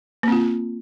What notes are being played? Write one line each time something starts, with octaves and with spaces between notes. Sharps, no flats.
A#3 C4 F4